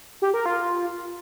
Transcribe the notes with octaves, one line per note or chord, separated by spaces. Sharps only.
G4
A#4
F4